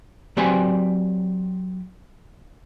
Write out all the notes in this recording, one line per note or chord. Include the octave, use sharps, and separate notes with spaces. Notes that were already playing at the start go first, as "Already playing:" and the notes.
F#3 C4 G4 B4 D5 G#5